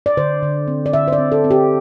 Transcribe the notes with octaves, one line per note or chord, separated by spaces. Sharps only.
D5
D3 C5
D3
C4
D5
D3 E5
C5
D5
C4
A4
C4
G4